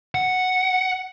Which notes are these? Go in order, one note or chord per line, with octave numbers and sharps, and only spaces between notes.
F#5